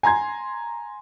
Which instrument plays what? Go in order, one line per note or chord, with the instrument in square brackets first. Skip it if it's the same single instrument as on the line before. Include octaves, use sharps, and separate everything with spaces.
[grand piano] G#5 A#5 C6 G#6